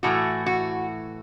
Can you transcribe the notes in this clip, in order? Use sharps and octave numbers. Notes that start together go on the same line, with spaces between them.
A2 E3 A3 F#4
F#4